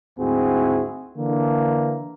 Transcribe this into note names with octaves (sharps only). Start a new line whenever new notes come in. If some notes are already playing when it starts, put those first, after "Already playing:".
D2 G#2 C4 E4 F#4 G#4
D3 E3 A#3